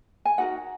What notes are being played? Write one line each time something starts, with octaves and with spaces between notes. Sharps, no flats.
G#5
D#4 F#4 A#4 F#5